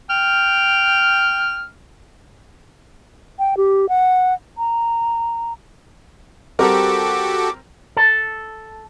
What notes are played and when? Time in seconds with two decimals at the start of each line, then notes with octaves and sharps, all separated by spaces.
0.10 G5 F6
3.39 G5
3.57 G4
3.89 F#5
4.58 A#5
6.59 G3 C4 F#4 G4 A4 A#4 D6
7.97 A4